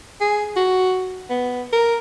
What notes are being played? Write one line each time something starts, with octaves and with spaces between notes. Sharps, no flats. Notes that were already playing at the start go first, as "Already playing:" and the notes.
G#4
F#4
B3
A#4